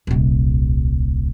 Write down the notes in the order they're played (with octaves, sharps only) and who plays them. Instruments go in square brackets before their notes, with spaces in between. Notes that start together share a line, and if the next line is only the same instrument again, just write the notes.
[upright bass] D#1 C2